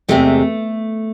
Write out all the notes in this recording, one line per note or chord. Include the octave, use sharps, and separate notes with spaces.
E2 C3 G#3 A3